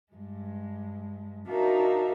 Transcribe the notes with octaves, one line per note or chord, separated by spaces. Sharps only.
G2 G#3
D4 D#4 F#4 A#4 E5 F5